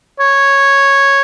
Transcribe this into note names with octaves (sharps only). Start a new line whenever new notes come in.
C#5